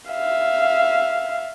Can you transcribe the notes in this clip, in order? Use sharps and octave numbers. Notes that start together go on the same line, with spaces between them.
E5 F5